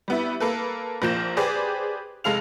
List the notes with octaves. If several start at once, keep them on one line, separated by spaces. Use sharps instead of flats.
G3 B3 E4
A#3 A4 B4
A#1 F3 A#3 G6 E7
G4 G#4 B4 C5 D5
F1 G#3 A4 F5 F7